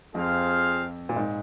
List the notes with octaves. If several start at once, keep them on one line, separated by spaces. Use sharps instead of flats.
F2 C4 F4 G#4 C5 F5
A#2
G#2